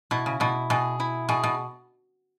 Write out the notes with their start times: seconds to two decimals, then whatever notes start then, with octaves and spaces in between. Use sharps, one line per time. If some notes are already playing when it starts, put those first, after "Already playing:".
0.11 B2 E4
0.26 C#3
0.40 B2 E4
0.70 B2 G#4
1.00 E4
1.29 B2 G#4
1.43 B2